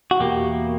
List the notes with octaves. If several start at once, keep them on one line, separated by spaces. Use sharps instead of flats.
F#4
E2 B2 A#3 G4